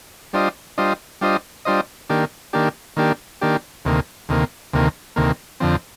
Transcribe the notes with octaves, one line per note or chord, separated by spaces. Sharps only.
G3 D4 F4 C5 D#5
G3 D4 F4 C5 D#5
G3 D4 F4 C5 D#5
G3 D4 F4 C5 D#5
D#3 A#3 D4 G4
D#3 A#3 D4 G4
D#3 A#3 D4 G4
D#3 A#3 D4 G4
D2 C3 D#3 A#3
D2 C3 D#3 A#3
D2 C3 D#3 A#3
D2 C3 D#3 A#3
F2 D3 F3 C4